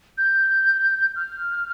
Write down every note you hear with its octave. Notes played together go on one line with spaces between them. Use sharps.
G6
F6